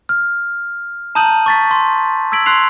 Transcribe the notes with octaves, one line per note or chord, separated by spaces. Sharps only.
F6
A5 A#5 D#6 G6 D#7 F#7
C#6 A6 B6
C6
E6 G#6 B6 D7 F#7
C6 F#6 C7 F7 F#7